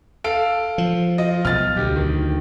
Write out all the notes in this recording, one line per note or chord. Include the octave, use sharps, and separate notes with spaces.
A4 F5 D7
F3
F4 D#5
B1 F6 A6
D2 G4
D#3